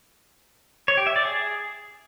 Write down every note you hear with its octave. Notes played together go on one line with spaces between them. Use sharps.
C#5
G4
E5
D5
G#4